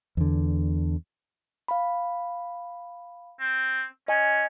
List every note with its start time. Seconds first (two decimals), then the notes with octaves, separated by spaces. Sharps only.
0.17 E2 D3
1.68 F5 B5
3.40 C4
4.08 C#4 D#5 G#5